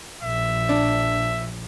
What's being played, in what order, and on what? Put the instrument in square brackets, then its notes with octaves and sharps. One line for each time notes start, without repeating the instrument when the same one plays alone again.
[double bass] A#1 F3 [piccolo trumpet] E5
[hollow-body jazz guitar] D4